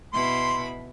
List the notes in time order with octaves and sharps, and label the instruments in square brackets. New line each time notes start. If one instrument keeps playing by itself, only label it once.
[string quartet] B2 E4 B5 [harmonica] C6